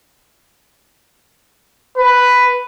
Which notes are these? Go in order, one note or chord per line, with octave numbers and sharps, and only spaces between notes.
B4